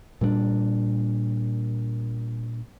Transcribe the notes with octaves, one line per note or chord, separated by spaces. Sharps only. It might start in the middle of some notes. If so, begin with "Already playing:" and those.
A#2 G3 A3 D4